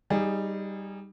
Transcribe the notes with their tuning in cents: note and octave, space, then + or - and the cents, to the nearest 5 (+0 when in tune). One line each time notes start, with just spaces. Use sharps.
G3 +0 D#4 +0 G#4 -25